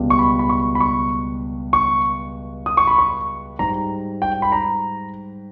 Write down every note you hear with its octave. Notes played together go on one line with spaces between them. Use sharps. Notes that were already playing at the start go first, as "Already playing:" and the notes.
Already playing: C#2 B2 G3
C#6
B5
B5
C#6
B5
C#6
C#6
D#6
C#6
B5
C#6
G#2 G3 A#5
G5
B5
A#5